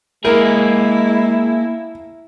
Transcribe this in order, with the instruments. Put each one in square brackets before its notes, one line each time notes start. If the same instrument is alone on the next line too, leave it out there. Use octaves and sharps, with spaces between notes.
[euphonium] G#3 [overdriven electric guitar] A#3 G#4 [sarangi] E4 [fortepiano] A#4